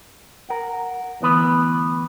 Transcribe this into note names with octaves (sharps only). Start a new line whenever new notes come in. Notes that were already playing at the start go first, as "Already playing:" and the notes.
A#4 F#5
D2 E3 B3 B4